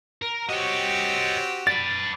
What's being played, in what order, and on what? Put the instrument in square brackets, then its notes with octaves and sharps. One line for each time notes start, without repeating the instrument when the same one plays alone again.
[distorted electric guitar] A#4
[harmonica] C4 F#4 G4 [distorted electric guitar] C#5 D#5
[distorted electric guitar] B4 D5 [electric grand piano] A6